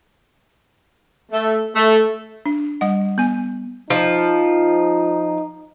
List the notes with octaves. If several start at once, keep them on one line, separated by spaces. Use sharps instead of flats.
A3
A3
D4
G3 D#5 F#5
B3 G#5
F3 D#4